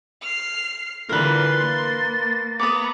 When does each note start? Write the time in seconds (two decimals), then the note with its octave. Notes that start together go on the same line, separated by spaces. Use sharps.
0.22 F6 C7
1.09 D3 E3 G3 F4 A#4 B4 C6
1.55 A#3 A6
2.60 B3 A#5 D6 D#6